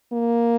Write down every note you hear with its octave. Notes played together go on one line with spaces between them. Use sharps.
A#3